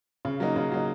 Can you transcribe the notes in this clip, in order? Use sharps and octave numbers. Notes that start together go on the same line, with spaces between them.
C#3
F#3 A#3 D#4
C#3
F#3 A#3 D#4